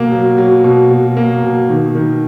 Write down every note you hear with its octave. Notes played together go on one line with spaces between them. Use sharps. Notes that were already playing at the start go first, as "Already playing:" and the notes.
Already playing: B2 A#3
F#3
F#3
B2
B2
A#3
B2
D#3
D#3